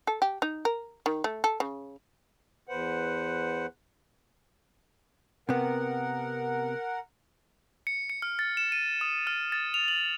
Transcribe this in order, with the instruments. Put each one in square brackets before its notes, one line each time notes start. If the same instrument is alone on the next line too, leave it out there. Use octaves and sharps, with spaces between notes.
[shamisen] A4
G4
D#4
A#4
D#3
A3
A4
C#3
[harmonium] E2 B4 C5 F#5
[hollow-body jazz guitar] C3 B3 [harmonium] A#4 F#5
[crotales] C#7
C#7
F6
A6
E7
D#7
D#6
F6
A6
F7
F#7